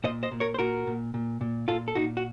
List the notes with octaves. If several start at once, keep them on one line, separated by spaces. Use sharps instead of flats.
A#2 C5 D#5
C5 D#5
A#2
A#4 C#5
C5
A#2 F#4 A#4
A#2
A#2
A#2
A#2 F4 A4
A4
A#2 D#4 F#4
F#4